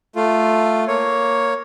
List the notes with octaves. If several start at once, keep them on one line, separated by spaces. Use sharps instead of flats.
A3 F4
A#3 C#5